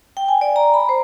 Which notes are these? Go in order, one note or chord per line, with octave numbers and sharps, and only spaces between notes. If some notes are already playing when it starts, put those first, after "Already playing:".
G5
G#5
D5
A#5
B5
C5